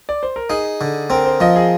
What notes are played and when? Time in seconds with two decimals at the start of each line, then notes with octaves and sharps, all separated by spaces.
0.09 D5
0.23 C5
0.36 A#4
0.50 D#4 G#4
0.81 D3
1.10 C4 A#4
1.26 C5
1.40 F3 D#5
1.56 G#4